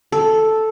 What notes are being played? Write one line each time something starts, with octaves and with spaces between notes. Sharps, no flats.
A4